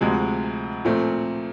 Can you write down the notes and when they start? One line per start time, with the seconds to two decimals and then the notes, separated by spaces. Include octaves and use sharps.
0.01 D2 C3 F3 G#3
0.85 A#2 F3 A3 C4